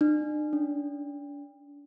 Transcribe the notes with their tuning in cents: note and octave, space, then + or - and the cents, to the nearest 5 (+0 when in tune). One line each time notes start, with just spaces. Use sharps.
D4 +40
D4 -40